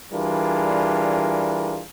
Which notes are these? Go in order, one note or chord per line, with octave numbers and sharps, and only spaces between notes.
E3 G3 D4 F4 G#4 A#4